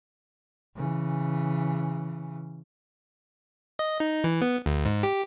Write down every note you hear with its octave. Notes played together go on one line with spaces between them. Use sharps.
C#3 E3
D#5
D#4
E3
B3
D2
G#2
G4